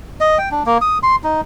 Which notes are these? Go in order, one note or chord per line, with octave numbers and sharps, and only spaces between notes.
D#5
G5
D4
A#3
D#6
C6
D#4